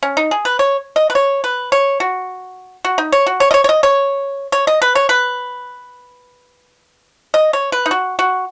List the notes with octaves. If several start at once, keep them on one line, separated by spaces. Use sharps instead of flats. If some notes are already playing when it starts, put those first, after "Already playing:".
C#4
D#4
G#4
B4
C#5
D#5
B4
C#5
B4
C#5
F#4
F#4
D#4
C#5
F#4
C#5
D#5
C#5
C#5
D#5
C#5
C#5
D#5
B4
C#5
B4
D#5
C#5
B4
D#4
F#4
F#4